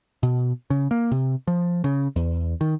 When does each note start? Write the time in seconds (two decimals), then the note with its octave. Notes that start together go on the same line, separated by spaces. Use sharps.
0.23 B2
0.70 C#3
0.91 A#3
1.11 C3
1.47 F3
1.84 C#3
2.16 E2
2.61 D#3